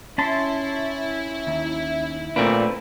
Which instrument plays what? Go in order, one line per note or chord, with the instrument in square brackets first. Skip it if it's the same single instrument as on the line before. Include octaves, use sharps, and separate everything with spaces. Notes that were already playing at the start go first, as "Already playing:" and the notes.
[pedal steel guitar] C#4 A5 C6 [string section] E4
[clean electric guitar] D#2
[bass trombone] A#2 [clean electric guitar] A3 C4 D4 [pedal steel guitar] B4